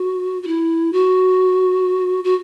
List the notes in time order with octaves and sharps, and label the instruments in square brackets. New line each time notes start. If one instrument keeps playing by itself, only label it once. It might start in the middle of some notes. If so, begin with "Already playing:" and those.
Already playing: [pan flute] F#4
F#4
E4
F#4
F#4